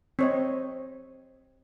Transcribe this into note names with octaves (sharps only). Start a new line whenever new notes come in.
C4 C#5 D#5